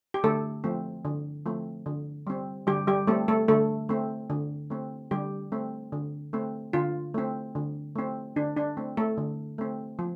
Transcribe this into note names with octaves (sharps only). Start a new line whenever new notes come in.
G4
D3 A3 A4
F3 A3 C4
D3
F3 A3 C4
D3
G3 C4
D3 G3 G4
G3 G4
G3 A3 C4 A4
A3 A4
D3 A3 A4
A3 C4
D3
A3 C4
D3 G3 G4
A3 C4
D3
A3 C4
D3 F4
A3 C4
D3
A3 C4
D3 D4
D4
A3 C4
A3 A4
D3
A3 C4
F3